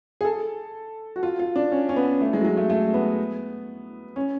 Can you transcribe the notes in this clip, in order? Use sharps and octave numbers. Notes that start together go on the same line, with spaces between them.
G#4
A4
F#4
F4
F4
D4
C#4
C#4
B3
A3
G#3
F#3
G#3
A3
A3
B3
C#4